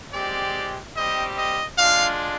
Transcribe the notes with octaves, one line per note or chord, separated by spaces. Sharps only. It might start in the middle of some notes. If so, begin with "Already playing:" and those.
G#3 C4 G4 D5
G3 C4 G4 D#5
D#5
G#3 D4 F4 F5